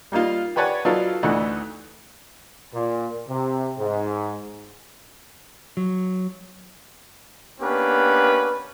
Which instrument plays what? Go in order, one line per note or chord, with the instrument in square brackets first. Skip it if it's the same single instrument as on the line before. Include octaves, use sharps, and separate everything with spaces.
[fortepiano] G3 A#3 D#4 F4
G4 B4 C#5 D5 F#5 G#5
F#3 D#4 F4 A4 B4 D5
D2 E3 A3 D4 D#4 F#5
[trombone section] A#2
C3
G#2
[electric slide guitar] F#3
[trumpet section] A#3 B3 C#4 D4 G4 B4